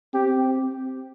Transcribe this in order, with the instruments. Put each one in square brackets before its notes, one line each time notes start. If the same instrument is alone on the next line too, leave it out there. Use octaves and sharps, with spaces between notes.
[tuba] C4 [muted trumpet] G4